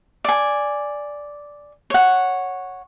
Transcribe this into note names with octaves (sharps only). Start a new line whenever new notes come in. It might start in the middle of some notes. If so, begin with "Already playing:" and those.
D5 G#5
C#5 F#5